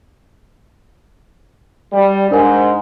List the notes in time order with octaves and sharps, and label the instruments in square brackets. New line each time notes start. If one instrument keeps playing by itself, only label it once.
[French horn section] G3
[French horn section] G#2 [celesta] D4 A#4 G#5